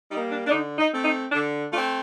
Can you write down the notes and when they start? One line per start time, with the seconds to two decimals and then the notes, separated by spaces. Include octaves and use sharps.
0.11 G3 D#4
0.15 A#3
0.31 D4
0.47 D4
0.51 D3 D#4
0.78 D#4
0.92 A3 C4
1.05 D#4
1.32 D3 D4
1.72 A3 C4 D4 F4